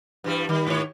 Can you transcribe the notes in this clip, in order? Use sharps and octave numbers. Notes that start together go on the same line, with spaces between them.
G2 E3 G3
D#3 G3
G#2 D#3 C#5